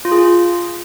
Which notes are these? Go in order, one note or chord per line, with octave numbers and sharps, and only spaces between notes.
F4
G#4
F4